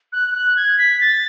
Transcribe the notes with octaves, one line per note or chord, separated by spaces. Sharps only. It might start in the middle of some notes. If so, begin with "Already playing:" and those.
F#6
F#6
G#6
B6
A6